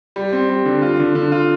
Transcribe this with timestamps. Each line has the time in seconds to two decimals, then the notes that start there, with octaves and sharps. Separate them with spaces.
0.16 G3
0.32 C4
0.49 G3
0.66 D3
0.82 F4
0.99 D3
1.15 D3
1.32 F4